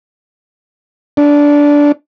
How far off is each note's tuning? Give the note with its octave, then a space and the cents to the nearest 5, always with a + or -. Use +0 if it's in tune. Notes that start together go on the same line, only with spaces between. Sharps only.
D4 -15